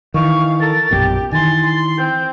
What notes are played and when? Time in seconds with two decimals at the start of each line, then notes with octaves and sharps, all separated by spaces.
0.14 D#3 E3 F5 C#6
0.60 A4 A#4 A6
0.91 A#1 F#2 B2 G4
1.32 D#3 E3 G#5 C6 A6
1.65 C6
1.97 C4 G6